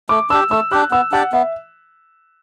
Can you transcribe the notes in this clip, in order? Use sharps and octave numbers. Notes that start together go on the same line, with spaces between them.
A3 D6
D4 G4 E6
A3 E6
D4 G4 F#6
B3 E6
D4 G4 D5 F#5
B3 E5